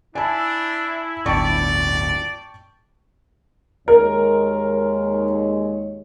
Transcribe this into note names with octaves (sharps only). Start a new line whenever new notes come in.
D4 E4 G#5 A5
D1 G1 D5 G5 A5 C#6
D#2 G#3 A#4 C#5